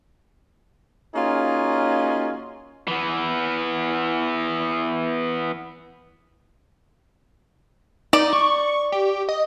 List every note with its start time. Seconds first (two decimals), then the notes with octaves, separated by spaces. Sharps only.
1.15 A#3 C#4 D#4 F4 F#4 G#4
2.88 E3 B3
8.13 D#4 D5
8.33 C#6
8.92 G4
9.29 D#5